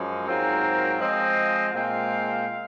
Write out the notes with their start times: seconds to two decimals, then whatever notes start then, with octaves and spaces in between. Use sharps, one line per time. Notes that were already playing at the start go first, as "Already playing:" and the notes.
Already playing: F#2 F3 G#3 C#4
0.27 G#2 F#3 C4 F4 A#4
1.00 F3 G#3 C4 F4 D#5
1.72 A#2 G#3 C4 F4 F5